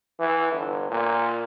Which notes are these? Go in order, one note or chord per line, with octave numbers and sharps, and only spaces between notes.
E3
G1
A#2